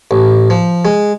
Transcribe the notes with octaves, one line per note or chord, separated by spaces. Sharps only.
A1
F3
G#3